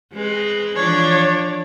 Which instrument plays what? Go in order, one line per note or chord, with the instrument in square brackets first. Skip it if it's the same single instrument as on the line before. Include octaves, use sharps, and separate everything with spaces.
[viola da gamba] G#3 C4 B4
[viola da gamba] E3 F3 D4 [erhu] C#5